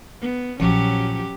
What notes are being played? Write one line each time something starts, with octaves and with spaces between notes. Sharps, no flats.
B3
A#1 F3 F#3 C#4 G4